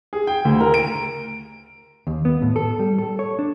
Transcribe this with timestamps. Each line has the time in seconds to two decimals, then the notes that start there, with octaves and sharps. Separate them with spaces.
0.13 G#4
0.27 G5
0.45 D2
0.60 A#4
0.74 D7
2.07 D#2
2.25 B3
2.42 A2
2.56 A4
2.79 G3
2.98 A4
3.19 C#5
3.39 D4